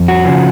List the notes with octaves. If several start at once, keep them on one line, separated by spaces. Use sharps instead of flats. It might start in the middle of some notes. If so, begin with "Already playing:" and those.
Already playing: F2
F#4
C#3 F3